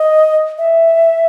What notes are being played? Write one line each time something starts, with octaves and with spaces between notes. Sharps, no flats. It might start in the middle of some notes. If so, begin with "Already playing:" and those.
Already playing: D#5
E5